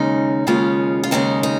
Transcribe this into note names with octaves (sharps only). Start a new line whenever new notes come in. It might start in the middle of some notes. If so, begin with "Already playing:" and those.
Already playing: D#2 C#3 G#3 C#4 D#4
D#2 C#3 G#3 C#4 F4
F4
D#2 C#3 G#3 C#4 D#4
D#4